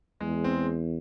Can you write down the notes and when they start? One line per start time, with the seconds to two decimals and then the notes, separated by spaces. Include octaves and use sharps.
0.21 E2 G#3
0.44 C4